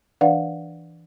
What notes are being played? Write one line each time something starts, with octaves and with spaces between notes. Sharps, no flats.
E3 D4 B4 D5 F5 F#5